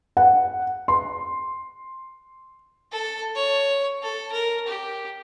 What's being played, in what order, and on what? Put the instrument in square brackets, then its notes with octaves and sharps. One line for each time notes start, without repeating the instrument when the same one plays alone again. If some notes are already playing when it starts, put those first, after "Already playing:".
[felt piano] F#5
C6
[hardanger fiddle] A4
C#5
A4
A#4
G4